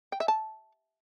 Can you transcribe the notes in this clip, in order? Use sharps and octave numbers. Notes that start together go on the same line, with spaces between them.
G5
E5
A5